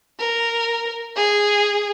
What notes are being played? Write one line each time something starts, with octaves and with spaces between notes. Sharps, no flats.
A#4
G#4